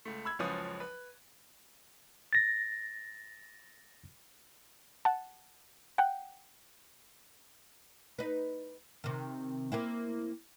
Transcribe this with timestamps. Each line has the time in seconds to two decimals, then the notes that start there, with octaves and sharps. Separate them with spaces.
0.05 C#2 A3
0.25 B5 E6 G#6
0.39 F#1 C#2 F3 C#4 B4 D#6
0.80 B4
2.33 A6 A#6
5.05 F#5 A5
5.98 F#5 G5
8.19 D#4 B4
9.04 C3 D#3
9.72 A#3 C4 E4